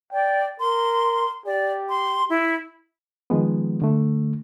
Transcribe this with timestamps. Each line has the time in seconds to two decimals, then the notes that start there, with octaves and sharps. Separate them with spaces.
0.13 D5 G5
0.60 A#4 C6
1.46 G4 D5
1.89 C6
2.30 E4
3.30 D#3 F3 G#3 B3
3.82 D3 A3